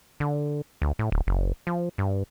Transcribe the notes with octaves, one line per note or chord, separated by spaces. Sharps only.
D3
D2
A2
D1
F#1
F3
G2